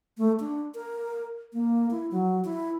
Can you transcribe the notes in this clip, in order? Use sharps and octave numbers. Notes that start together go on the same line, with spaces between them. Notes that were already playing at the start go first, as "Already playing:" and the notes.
A3
D4
A#4
A#3
E4
F#3
E4